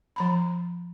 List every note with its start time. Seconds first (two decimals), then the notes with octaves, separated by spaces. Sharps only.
0.16 F3 A#5 B5